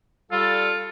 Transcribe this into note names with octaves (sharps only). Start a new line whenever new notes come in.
G3 F4 A4